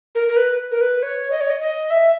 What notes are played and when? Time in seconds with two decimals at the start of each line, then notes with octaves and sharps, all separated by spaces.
0.15 A#4
0.28 A#4
0.37 B4
0.71 A#4
0.81 B4
1.03 C#5
1.31 D#5
1.41 C#5
1.50 D#5
1.61 D#5
1.90 E5